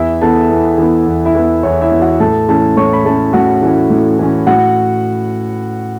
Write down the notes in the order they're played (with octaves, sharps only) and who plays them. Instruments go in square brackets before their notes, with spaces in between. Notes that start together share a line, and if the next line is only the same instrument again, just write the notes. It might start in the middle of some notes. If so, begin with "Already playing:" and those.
Already playing: [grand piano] E2 E4 E5
E3 B3 A4 A5
E2
E3 B3
E2
E4 E5
E3 B3
E2 C#5
E4 E5
E3 B3
F#4 F#5
A2 A4 A5
E3 A3 C#4 A4 A5
A2 C#5 C#6
B5
E3 A3 C#4 A4 A5
A2 F#4 F#5
E3 A3 C#4
A2
E3 A3 C#4
A2 F#4 F#5